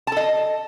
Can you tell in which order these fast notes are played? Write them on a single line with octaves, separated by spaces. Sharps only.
A5 A4 D#5